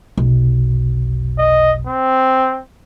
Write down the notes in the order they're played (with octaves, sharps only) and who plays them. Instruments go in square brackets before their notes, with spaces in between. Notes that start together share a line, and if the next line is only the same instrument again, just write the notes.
[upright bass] F1 B1
[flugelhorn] D#5
C4